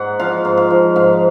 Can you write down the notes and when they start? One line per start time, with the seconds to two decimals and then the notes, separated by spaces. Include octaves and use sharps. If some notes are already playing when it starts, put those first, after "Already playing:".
Already playing: G#2 F#5
0.19 F3 F5
0.45 G#2
0.57 F5
0.70 F3
0.95 G#2 F5